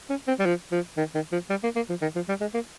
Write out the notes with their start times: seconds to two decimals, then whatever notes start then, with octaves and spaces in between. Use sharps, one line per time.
0.10 C#4
0.27 C4
0.39 G3
0.45 F3
0.72 F3
0.97 D#3
1.14 D#3
1.32 F3
1.50 G3
1.63 A#3
1.76 A#3
1.89 F3
2.02 D#3
2.15 F3
2.29 G3
2.41 G#3
2.54 A#3